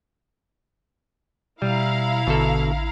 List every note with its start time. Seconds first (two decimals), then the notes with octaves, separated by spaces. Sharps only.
1.62 B2 G3 E4 F5 A#5
2.27 A1 B2 D3 A4